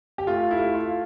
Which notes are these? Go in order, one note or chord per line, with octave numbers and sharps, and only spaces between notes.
G4
A3 F4
E4
A3
F4